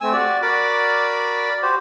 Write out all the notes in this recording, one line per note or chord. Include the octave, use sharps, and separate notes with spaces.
A3 C4 G#5 E6
F#4 G4 D5
F#4 A#4 D5 B5 D6
F#4 G4 C5